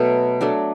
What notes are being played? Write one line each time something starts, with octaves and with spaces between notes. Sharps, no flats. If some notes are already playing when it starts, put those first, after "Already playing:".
Already playing: B2 F#3 A3 B3
F#3 A3 D4 A4